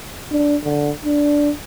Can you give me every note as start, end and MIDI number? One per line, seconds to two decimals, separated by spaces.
0.31 0.56 62
0.64 0.91 50
1.05 1.51 62